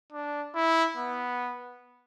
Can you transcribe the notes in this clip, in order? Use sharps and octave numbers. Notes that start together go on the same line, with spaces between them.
D4
E4
B3